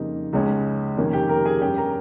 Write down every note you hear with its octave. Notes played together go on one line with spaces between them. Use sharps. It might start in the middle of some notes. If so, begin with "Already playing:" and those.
Already playing: F2 C#3 G3 A#3 D#4
C#2 C#3 G#3 C#4
F2 C3 D#3 A#3 C#4
G4 G5
A#4 A#5
G#4 G#5
G2 G3 C#4 G4 G5
A#4 A#5